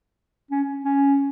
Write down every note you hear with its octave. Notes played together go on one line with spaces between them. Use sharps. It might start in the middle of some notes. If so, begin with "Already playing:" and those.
C#4
C#4